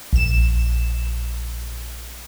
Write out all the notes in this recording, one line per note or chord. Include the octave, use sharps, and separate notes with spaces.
A#1 E7